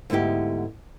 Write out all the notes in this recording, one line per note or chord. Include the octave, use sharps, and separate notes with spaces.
D2 G#2 B3 E4 G4